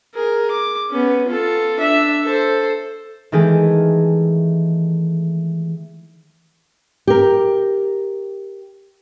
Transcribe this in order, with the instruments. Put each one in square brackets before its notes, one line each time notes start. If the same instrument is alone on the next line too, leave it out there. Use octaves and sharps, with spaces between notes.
[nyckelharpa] G#4 A#4
D6
B3 C#4
F4 A4
D4 E5
A4 C5
[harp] D#3 E3 G#3 A3 G4 G#4
[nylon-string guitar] G4 A#4